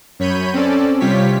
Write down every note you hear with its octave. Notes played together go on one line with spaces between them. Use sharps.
F#2 C#5 B5 G6 D#7
C4 C#4 A4 D5
C3 G3 F4 G4 C#5 B6